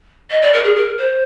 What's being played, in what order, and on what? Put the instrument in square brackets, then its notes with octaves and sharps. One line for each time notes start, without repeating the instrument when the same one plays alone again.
[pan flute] D#5
D5
A#4
G#4
A#4
C5